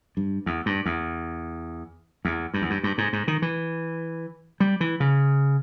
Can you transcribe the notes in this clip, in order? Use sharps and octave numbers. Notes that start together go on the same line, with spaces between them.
G2
E2
G2
E2
E2
G2
E2
G2
G2
G#2
G#2
D#3
E3
G3
E3
C#3